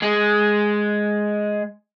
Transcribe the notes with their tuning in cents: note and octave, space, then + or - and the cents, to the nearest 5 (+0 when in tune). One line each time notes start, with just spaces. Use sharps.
G#3 +5